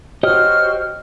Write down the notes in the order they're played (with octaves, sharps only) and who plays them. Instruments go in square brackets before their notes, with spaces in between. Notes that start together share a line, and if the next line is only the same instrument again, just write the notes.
[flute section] F#4 C5 F6 [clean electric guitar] G4 C#5 D#5